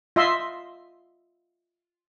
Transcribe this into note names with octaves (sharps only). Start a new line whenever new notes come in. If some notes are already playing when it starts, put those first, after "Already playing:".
F4 D#5 E5 C6